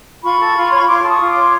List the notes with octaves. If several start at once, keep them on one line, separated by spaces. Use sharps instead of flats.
F4 B5 C#6
A4
F4
C#5 C6
C#6
F4 C6 D6
A4
C#6 D#6
F4
C6 D6
C#5